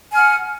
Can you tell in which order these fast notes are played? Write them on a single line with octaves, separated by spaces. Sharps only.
G#5 F6 F#5